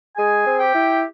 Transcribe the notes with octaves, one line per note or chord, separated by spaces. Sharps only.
G#3 G#4 G#5
C4
G4 G5
E4